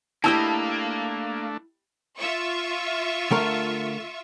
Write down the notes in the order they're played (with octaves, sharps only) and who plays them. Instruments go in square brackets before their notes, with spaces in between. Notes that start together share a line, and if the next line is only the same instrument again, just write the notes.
[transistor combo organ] A3 D4 [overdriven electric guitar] A#3 [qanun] E4 G4 D#5 [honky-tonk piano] A5 E6
[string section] F4 E5 C#6
[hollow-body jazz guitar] D3 A3 A#4